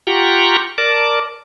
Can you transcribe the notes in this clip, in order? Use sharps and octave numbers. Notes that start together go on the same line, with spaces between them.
F4 G4 F#5 G5 A#5 C#6
A#4 D5 A5 D6